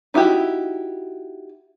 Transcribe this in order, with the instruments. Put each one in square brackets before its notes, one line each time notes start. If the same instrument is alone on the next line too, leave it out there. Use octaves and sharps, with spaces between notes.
[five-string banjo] D#4 E4 F#4 G4